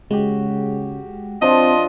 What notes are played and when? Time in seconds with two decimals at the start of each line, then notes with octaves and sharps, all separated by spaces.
0.11 C#3 G#3 F#4 G4
1.42 F3 C4 D4 F4 D#5